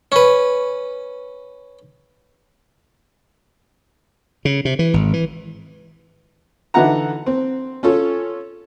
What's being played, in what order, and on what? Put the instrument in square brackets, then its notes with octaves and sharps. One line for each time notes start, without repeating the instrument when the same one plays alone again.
[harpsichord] C#4 B4
[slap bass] C#3
C3
E3
G#1
E3
[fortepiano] D3 E3 D#4 E4 F#5 A#5
C4
C#4 F4 A4 C#5